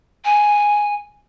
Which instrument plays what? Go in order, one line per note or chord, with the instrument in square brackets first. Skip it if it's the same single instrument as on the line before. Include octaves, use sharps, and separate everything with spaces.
[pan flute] G#5